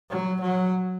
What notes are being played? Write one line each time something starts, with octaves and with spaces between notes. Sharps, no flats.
F#3
F#3